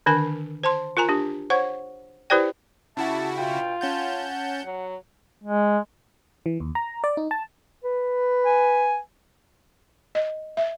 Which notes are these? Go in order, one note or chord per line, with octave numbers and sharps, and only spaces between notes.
D3 D#3 D4 A#4 G#5
C5 A5 C6
F4 A#4 G#5 A#5
D4 G4
C5 C#5 F#5 C#6
E4 G4 B4 C5 D5 G5
C#3 E4 F#4 G4 E5 A5
G2 B2 F4 G5
C#4 F#5 A5 G6
F#3
G#3
E3
D#2
A#5
D5
D#4
A5
B4
G#5
D#5
E5